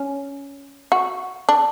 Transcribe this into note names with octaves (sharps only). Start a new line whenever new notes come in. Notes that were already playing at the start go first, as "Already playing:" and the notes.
Already playing: C#4
F#4
D4